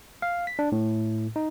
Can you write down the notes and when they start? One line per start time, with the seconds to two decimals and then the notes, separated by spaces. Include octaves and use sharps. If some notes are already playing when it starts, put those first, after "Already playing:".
0.22 F5
0.47 B6
0.59 D4
0.72 A2
1.36 D#4